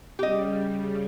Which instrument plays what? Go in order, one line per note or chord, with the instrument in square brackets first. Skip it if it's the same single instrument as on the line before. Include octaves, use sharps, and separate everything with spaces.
[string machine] C#3 G3 [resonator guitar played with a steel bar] G4 D#5